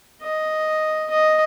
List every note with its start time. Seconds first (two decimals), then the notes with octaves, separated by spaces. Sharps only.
0.22 D#5
1.10 D#5